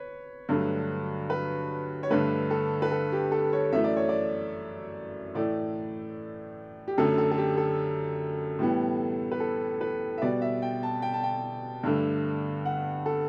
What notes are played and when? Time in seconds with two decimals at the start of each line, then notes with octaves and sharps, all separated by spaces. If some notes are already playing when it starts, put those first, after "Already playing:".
Already playing: B4 C#5
0.49 G2 D3 F#3 A3
1.30 B4
2.03 C#5
2.10 G2 D3 A3 B4
2.51 A4
2.82 B4
2.92 A4
3.12 G4
3.32 A4
3.53 C#5
3.72 F#2 E3 A3 E5
3.84 D5
3.97 C#5
4.09 D5
5.34 A2 E3 A3 D5
6.88 G4
6.98 F#2 D3 A3 A4
7.18 A4
7.31 A4
7.38 G4
7.57 A4
8.59 A2 E3 G3 B3
9.32 B4
9.40 A4
9.81 B4
10.18 E5
10.22 B2 G3 B3 D5
10.42 E5
10.62 G5
10.83 A5
11.02 G5
11.14 A5
11.23 G5
11.84 G2 D3 A3
12.66 F#5
13.06 A4